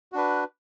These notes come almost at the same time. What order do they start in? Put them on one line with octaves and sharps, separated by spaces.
F#4 D4 B4